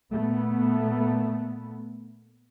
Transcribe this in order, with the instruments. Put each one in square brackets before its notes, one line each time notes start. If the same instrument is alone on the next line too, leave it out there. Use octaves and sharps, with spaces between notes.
[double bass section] A#2 A3 B3